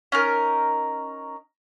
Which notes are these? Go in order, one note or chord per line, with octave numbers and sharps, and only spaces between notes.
C#4 D#4 A#4